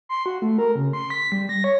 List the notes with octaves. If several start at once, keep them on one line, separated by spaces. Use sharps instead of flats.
C6
F#4
A3
A#4
C#3
C6
B6
G3
A#6
C#5